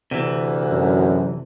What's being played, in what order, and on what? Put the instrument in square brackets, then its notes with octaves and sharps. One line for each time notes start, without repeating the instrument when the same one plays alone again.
[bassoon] D2 [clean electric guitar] C3 E3
[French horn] F#2